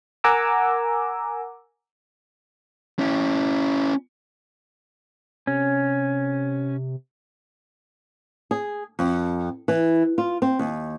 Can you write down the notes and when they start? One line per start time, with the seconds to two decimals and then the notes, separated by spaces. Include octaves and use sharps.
0.24 A#4 F#5 G#5 A#5 D6 E6
2.99 C#4 E4
5.47 C3 C#4
8.51 G#4
8.99 F2
9.68 E3
10.18 F4
10.42 C4
10.59 D#2